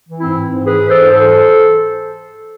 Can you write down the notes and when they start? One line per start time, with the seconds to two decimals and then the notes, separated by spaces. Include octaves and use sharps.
0.08 E3
0.19 C4 E4
0.26 G#2
0.42 G#2
0.60 E3
0.65 G#4 B4
0.77 E3
0.88 A4 C5
0.95 G#2
1.12 E3 A4 C5